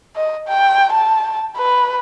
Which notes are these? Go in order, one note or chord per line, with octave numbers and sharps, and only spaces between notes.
D#5
G5
A5
B4